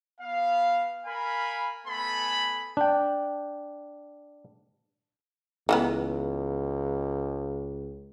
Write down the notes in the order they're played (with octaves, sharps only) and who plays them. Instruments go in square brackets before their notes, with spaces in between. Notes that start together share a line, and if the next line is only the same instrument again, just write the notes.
[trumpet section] B3 F5
A#4 F5 G#5 B5
A3 B3 A4 G#5 B5
[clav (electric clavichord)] D4 G5
[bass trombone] C#2 [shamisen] E3 A#3 B3